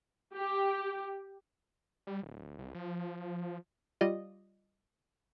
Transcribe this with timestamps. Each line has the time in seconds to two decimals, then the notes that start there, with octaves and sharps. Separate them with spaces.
0.35 G4
2.07 G3
2.23 D1
2.58 C2
2.75 F3
4.01 G3 F4 G4 D5 D#5